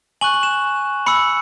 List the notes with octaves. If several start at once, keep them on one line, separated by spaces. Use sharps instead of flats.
G#5 C#6 F#6 F#7
F#7
E7
B5 E6 C#7